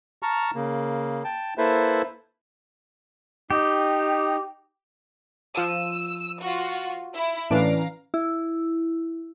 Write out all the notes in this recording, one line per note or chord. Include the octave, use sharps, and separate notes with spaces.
A5 A#5 C#6 F6
C#3 A#3
G5 A5
A#3 E4 A4 B4 C5 E5
D#4 G4
F3 E6 D#7
F4 F#4
E4
A2 E3 C#4 D4 B4 F5 A#5 D7
E4